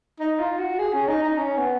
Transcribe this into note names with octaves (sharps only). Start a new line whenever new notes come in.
D#4
F4
F#4
G#4
C#4
D#4
D#4
C#4
B3